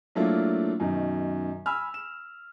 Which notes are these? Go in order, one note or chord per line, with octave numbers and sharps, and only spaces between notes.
F#3 A3 A#3 D4 E4 F4
F#2 B2 D#3
G#5 B5 E6 F6
E7